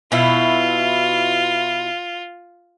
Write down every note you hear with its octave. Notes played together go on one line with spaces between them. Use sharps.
B2 E4 F4